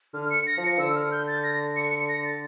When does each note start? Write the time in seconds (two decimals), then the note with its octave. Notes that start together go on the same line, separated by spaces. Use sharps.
0.13 D3 F6
0.31 C#7
0.47 A#6
0.57 F3
0.63 C#7
0.78 D3 E6
0.96 F6
1.11 G6
1.27 A6
1.43 A#6
1.77 C#7
2.09 A#6
2.25 A6